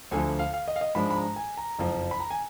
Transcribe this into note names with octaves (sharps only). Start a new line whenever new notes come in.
D2 D3 F3 G#5
F5
F5
D#5
F5
D#5
G#2 F3 G#3 D4 B5
B5
A#5
G#5
A#5
F#1 F2 F3
B5
A#5
G#5